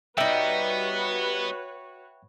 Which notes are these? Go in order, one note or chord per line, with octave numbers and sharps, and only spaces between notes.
G3 B3 D#4 F#4 B4 C#5 E5 G5